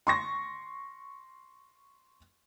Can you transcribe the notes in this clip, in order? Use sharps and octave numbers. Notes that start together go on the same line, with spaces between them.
C6 C#6 A#6